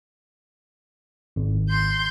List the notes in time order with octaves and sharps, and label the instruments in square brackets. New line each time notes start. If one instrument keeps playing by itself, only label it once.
[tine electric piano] G#1
[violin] C6 G6